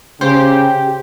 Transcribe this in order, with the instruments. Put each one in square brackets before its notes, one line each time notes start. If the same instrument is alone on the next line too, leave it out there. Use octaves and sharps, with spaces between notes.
[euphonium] C#3 [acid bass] G4 [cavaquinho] C5